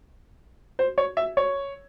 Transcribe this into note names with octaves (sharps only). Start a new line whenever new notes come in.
C5
C#5
E5
C#5